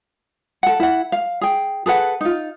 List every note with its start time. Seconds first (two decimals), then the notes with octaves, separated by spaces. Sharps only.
0.63 A4 F#5
0.80 E4 F#5
1.12 F5
1.41 G#4 G5
1.86 G#4 A4 B4 F#5
2.21 D#4 F4